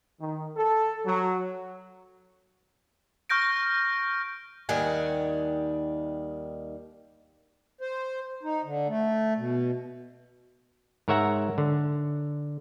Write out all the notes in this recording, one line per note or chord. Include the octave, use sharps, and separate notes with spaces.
D#3
A4
F#3
C#6 F6 G6 A#6 D7
D#2 D#3 G3 F#5 G#5
C5
D#4
D3
A3
B2
G#2 A#4 C#5 E5 F#5 A#5
D3